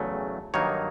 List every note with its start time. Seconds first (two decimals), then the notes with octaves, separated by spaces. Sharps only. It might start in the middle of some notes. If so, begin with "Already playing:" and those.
Already playing: E2 C#3 F#3 A3
0.54 G2 D#3 F#3 A#3 D#4 C#5